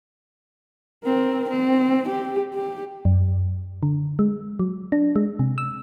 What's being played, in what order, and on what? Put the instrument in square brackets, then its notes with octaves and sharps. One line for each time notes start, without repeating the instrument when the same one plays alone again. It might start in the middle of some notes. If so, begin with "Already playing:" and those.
[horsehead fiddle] C4 A#4
C4
G4
G4
[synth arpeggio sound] F#2
D3
G#3
F#3
D4
G#3
C3
E6